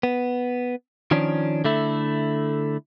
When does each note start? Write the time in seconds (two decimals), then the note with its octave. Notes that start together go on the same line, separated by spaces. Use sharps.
0.03 B3
1.11 D#3 F3 C#4 D4
1.64 D3 A3 E4